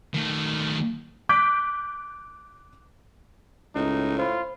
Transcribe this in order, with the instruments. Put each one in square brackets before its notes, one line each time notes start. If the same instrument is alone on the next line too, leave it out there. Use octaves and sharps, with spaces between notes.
[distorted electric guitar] D#3 A3
[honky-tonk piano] D6 F#6 G6 B6 D7
[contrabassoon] C#2 [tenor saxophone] A2 [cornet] D#4
[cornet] F4 [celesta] C5 B5